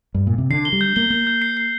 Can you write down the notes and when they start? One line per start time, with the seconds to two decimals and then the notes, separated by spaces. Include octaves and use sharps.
0.15 G2
0.27 A#2
0.38 C3
0.50 D3 C7
0.65 G7
0.73 G3
0.81 G6
0.96 A#3 G7
1.10 A#3 G6
1.27 G6
1.42 C7
1.57 C7